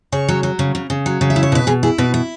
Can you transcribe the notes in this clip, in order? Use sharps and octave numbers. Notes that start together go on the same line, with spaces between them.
C#3 C#5
F#3
F#3
C#3
C#3
C#3
F#3
C#3
E5
E4
C#5
B2 B4
B2 G#4
E4 G#4
B2 B4
E4